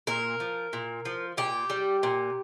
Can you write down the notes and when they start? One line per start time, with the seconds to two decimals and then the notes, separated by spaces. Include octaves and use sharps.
0.07 A#2 A#4
0.40 F3
0.73 A#2
1.05 F3
1.37 A#2 G4
1.70 G3
2.03 A#2